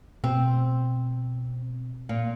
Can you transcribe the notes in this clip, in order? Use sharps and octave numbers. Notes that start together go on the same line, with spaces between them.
B2 C4
A#2